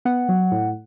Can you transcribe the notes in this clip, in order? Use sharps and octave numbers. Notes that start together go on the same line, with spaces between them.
B3 F#5
F#3
A2